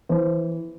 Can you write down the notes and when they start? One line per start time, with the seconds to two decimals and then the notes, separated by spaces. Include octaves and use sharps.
0.09 E3 C5